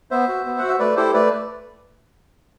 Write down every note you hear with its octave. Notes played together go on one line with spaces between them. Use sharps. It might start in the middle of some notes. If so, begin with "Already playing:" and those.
B3 C5 E5
F#4
B3
F#4 F#5
E5
A3 B4 D5
E4 G4 A4 C5
A3 B4 D5